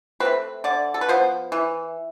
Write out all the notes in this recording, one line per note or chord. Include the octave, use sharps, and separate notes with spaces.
A3 C4 B4
D3 D5
A4
B4
F3 B3 C5
E3